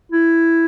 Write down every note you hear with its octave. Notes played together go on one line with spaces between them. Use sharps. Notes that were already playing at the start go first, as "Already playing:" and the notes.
E4